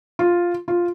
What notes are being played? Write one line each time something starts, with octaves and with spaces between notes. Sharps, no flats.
F4
F4